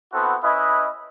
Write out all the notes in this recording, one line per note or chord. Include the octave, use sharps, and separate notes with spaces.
B3 C4 E4 F#4 A4
C#4 E4 B4 D#5